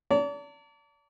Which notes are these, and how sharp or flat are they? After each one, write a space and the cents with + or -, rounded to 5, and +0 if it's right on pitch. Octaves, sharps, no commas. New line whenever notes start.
D5 -40 A5 +45